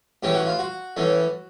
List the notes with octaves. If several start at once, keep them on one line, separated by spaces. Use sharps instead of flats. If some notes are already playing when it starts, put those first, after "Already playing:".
A2 E3 A3 C#4 G4
F#4
F4
F#4
A2 E3 A3 C#4